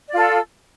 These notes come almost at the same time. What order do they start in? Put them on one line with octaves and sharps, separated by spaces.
D5 F4 A4